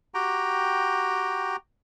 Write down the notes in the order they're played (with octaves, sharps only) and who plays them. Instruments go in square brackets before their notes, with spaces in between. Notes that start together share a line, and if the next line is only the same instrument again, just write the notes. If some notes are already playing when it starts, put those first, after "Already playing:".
[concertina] F#4 G4 G5 A#5